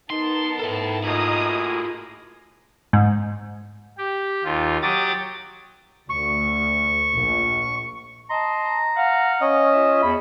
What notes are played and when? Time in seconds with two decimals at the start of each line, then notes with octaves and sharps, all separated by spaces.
0.10 B3 D#4 A#4 A5 C6
0.59 G#2 E4 A4
1.04 A2 A#3 E4 F4 G#4 D#5 A#5 D#6
2.93 G#2
3.98 G4
4.44 D#2 F4
4.82 F#3 G4 D6 D#6 A6
6.10 D2 C#6
7.14 A#1
8.30 D#5 A5 A#5 C6
8.96 F5 F#5
9.41 C#4 D#5
9.73 F4 E5
10.02 E2 B5